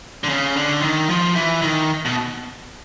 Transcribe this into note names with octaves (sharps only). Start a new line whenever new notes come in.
D3
C#3
D3
D#3
F3
E3
D#3
B2